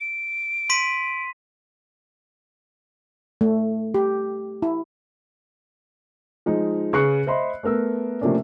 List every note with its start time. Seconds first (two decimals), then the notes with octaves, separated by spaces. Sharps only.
0.01 D7
0.70 C6 B6 D#7
3.41 A3
3.94 G4
4.62 E4
6.46 F3 G#3 D#4
6.93 C#3 B4 C#6 F#6 C7 C#7
7.27 C5 D#5 E5 B5 C6
7.63 A3 B3 A#4 E6
8.21 C3 F3 A3 A#3 C#4 D4